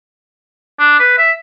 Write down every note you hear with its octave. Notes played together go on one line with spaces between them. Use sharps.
D4
B4
E5